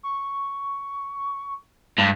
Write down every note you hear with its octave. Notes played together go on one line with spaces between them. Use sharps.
C#6
G2 G#3